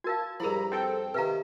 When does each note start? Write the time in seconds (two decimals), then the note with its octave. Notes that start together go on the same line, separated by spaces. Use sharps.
0.04 F#4 A#4 F5 A5 G#6
0.40 G2 F3 E4 G#4 A#4 A#5 B5
0.72 C4 A4 G5
1.14 C3 D#3 B4 F5 A#5